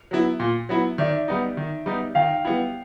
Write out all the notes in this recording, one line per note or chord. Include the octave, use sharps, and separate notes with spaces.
F#3 B3 E4
A#2
F#3 B3 E4
D#3 D5 E5
G3 B3 D#4
D#3
G3 B3 D#4
D#3 F5 G5
G3 B3 E4